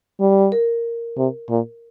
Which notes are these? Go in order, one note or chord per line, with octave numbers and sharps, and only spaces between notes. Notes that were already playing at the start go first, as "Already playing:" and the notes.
G3
A#4
C3
A#2